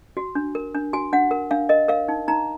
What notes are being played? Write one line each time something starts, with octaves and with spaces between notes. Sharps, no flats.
F#4
D4
A#4
D4
F#4 G#5
D4 F#5
A#4
D4 F5
A#4 D#5
A#4 F5
D#4
D#4 A#5